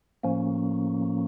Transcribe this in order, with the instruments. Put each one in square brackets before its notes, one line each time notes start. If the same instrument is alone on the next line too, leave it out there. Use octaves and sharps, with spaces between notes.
[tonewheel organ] A2 F3 A#3 C#4